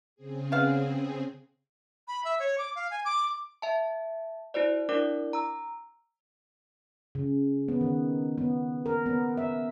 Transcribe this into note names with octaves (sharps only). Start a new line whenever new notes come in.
C#3 C4 G#4
B3 F5
B5
E5
C#5
D6
F5
G#5
D6
E5 A5
E4 F#4 C5 D5
D4 E4 A#4 D5 D6
A#5 E6
C#3
B3
D#3
B3
A#4
B3
E5